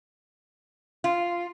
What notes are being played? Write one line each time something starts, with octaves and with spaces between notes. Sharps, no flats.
F4